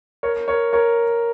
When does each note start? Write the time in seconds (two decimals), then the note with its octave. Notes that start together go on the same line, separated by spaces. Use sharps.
0.23 A#4 C#5
0.48 A#4 C#5
0.73 A#4 C#5